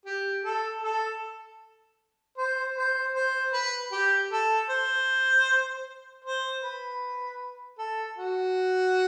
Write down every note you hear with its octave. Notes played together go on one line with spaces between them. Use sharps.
G4
A4
A4
C5
C5
C5
B4
G4
A4
C5
C5
B4
A4
F#4